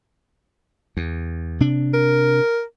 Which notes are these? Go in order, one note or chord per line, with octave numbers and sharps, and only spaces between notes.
E2
C3 D4
A#4